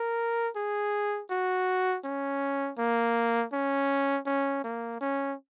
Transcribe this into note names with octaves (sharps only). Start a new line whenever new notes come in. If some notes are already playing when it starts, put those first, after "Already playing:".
Already playing: A#4
G#4
F#4
C#4
A#3
C#4
C#4
A#3
C#4